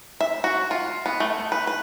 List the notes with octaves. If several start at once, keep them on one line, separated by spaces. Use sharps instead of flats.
E5
F#4
F4
B3
A3
B4
B4